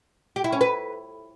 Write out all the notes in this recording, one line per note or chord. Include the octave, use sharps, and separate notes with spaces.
G4
E4
C#4
B4